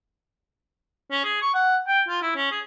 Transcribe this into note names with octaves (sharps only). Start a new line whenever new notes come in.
C#4
G#4
C#6
F#5
G5
F4
E4
C#4
G#4